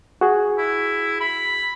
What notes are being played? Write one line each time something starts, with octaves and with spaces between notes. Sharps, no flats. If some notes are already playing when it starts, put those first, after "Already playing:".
F#4 G#4
E4
B5